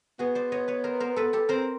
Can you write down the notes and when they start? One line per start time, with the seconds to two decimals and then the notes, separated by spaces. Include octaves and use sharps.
0.19 B3 F#4 G#4
0.35 C5 D5
0.52 C#5 D#5
0.68 B4 C#5
0.84 A#4 C5
1.00 A#4 C5
1.16 A4 B4
1.33 G4 A4
1.49 C4 A#4 C5